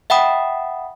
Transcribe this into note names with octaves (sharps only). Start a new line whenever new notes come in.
E5 F#5 G5 B5 D#6